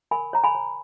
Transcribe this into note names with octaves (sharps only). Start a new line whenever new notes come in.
A#4 G#5 B5
C#5 A#5
G#5 B5
C#5